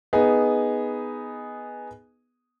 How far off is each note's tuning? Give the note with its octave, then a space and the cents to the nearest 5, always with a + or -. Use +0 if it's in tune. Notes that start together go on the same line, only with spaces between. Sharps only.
B3 +0 D#4 +0 G#4 +0